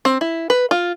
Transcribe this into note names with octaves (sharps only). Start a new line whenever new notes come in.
C4
E4
B4
F4